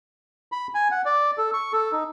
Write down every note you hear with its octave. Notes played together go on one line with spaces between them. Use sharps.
B5
G#5
F#5
D5
A4
C#6
A4
D#4